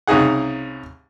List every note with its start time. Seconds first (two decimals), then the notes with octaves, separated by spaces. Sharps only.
0.07 C2 C#3 D#4 G#4 F#5